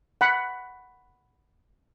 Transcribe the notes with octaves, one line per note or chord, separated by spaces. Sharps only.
F#5 B5